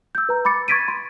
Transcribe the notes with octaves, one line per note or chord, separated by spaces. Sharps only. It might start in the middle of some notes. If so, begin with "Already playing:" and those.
E6 G6
B4 A#5
B5 D6 A6 C#7
C#6 G#6 A6 B6 D7 D#7
C6